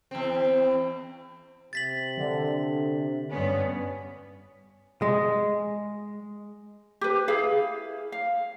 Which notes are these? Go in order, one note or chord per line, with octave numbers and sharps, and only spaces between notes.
E2 C4
C3 A6 B6 F#7
D3
G2 B3 C#4
G#3
G4 B4
E4 G#4 F5
F5